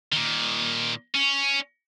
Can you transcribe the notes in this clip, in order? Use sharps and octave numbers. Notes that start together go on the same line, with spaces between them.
A#2 D#3
C#4